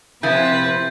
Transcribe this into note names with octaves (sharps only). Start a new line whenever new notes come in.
C3 F3 C4 E4 B4 G#5 G6 A6